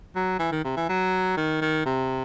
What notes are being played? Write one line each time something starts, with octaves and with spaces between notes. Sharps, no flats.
F#3
E3
D#3
C3
E3
F#3
D#3
D#3
C3